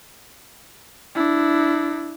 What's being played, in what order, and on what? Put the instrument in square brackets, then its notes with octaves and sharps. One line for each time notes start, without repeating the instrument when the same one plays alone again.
[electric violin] D4 E4